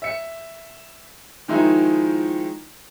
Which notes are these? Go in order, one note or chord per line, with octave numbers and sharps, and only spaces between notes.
E5 C#7
D#3 F3 G#3 D#4 E4